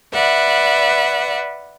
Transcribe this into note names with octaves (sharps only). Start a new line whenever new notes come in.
B4 D5 E5 F#5